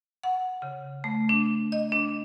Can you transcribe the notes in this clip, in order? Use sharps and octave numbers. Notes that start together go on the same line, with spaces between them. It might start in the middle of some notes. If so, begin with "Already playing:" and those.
F#5
C#3
A3
D4
D#5
D4